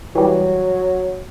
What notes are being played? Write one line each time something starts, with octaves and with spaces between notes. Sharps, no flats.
E3 F#3 G3